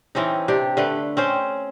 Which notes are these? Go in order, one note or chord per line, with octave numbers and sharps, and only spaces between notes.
E3 C4 C#4 D#4
C3 D4 G4
D3 A3 B4
C4 C#4 C5